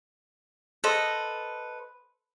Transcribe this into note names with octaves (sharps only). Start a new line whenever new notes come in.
A4 B4 C5 D#5